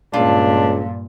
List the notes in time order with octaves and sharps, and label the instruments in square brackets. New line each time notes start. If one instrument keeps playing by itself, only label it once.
[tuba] C#2 [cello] G2 A#2 [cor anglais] D4 [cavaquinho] F4 A4